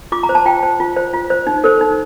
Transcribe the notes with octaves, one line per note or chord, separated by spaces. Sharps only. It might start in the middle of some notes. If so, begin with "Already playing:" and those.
F4 D6
A#5
C5
A5
F4 G5
C5
F4
C5
F4
C5
D#4
A4 C5
D#4